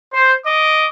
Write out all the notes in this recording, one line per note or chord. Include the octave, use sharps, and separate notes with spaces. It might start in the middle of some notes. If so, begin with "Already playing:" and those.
C5
D#5 D6